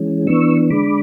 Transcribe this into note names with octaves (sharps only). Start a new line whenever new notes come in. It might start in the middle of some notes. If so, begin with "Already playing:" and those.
Already playing: E3 G#3 C#4
E3 B3 D4 C#6 E6
D3 G#3 D4 B5 D6